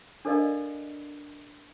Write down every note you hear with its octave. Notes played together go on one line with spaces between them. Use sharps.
D4 A4 A#4 D5 D#5 F5